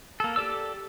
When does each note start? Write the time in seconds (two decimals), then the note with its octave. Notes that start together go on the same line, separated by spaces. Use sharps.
0.20 A#3 A4
0.36 G4 A4 D5 E6